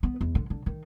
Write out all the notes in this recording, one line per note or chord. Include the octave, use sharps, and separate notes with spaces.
B3
E2
D3
D3
D#3